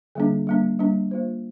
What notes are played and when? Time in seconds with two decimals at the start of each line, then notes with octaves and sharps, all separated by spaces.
0.15 D3 G3 A#3 D4
0.47 G3 A#3 D4
0.79 G3 A#3 D4
1.11 A#3 F4 C5